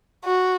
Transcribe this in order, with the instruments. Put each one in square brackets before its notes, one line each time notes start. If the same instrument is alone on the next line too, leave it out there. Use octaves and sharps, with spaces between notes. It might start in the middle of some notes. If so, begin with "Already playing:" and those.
[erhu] F#4